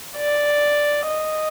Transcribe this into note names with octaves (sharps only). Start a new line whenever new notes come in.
D5
D#5